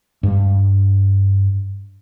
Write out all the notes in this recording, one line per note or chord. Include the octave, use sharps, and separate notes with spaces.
G2 G3